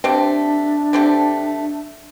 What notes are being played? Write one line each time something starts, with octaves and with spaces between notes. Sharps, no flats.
D3 A3 C4 D4 G4
D3 A3 C4 G4